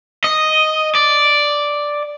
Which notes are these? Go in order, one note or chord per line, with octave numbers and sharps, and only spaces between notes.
D#5
D5